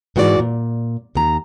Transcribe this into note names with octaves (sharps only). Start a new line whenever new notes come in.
G#2 E3 F#4 G4 D5
A#2
D#2 A#5